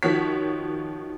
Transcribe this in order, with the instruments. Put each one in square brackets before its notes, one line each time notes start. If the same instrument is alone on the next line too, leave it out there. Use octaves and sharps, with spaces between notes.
[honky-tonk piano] D#3 F3 F#4 C#5 B6